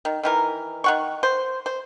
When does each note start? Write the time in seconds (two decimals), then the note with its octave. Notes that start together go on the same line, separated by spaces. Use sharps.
0.05 D#3
0.23 D#3 E3 A#4
0.84 D#3 F#5 C#6
1.23 C5
1.66 C5